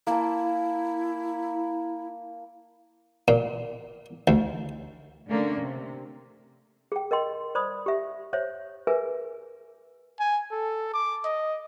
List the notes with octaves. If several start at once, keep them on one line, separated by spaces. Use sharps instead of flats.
A#3 E4 A5
A#2
D2
D3 A3 A#3 C#4
C3
G#4 G5
A#4 D#5 G5 C6
C5 D5 B5 D#6
G4 E5
C5 C#5 E5
G#4 A#4 B4 E5 G#5
G#5
A4
D6
D#5